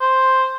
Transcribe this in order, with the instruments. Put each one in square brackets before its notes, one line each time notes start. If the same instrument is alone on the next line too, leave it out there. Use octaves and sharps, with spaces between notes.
[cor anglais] C5